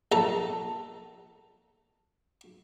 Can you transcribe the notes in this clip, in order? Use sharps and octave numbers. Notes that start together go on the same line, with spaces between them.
A#1 A4 A#5